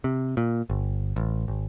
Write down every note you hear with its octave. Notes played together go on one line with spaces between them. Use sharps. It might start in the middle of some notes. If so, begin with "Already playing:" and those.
C3
A#2
G1
A1
G#1